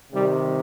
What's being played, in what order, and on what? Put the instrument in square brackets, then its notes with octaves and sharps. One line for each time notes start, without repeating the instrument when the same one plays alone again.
[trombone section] C3 D#3 G3